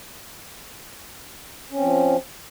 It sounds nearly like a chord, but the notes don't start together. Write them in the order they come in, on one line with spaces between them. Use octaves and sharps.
C#4 C4 F3